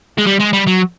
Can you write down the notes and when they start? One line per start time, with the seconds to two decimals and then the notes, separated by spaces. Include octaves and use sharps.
0.18 G#3
0.27 G3
0.40 G#3
0.54 G3
0.67 F#3